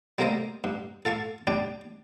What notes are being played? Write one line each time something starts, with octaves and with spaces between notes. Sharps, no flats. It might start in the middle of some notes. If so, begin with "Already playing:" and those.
G3 A3 A#3 A#4 C5 D#5
G2
A4 F5 A5 C#6
G3 D4 G5